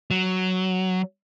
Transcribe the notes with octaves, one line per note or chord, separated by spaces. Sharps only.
F#3